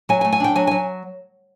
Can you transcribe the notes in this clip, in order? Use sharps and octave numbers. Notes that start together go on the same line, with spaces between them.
F#3 G#5
G#5
A3
G#5
D4 G5
F#3 G#5
G#5
F#3